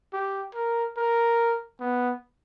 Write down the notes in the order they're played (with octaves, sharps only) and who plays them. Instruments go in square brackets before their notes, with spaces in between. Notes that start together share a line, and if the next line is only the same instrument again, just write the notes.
[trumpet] G4
A#4
A#4
B3